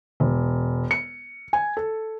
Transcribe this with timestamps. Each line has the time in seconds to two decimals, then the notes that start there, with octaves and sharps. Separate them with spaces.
0.20 E1
0.91 C#7
1.53 G#5
1.77 A4